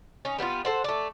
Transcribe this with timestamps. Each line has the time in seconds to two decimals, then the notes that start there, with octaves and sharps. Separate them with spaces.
0.25 C#4 D#4
0.38 G3 B3 D4 F4
0.65 A4 C5 F#5
0.84 A3 D5